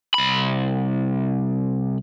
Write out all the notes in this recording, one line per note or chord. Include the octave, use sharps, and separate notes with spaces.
C2 B5